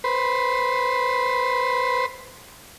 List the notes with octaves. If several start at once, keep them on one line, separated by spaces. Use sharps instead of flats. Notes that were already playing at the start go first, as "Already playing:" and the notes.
B4 C5